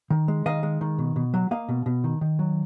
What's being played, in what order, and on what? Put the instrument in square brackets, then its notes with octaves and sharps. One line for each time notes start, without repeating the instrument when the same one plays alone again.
[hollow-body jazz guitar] D#3
G#3
D#3 D#5 F5
G#3
D#3
B2
B2
F#3
A#3 D#5 F5
B2
B2
D#3
D#3
F#3